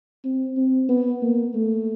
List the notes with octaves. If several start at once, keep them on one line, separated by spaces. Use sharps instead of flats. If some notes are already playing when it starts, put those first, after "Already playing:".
C4
C4
B3
A#3
A3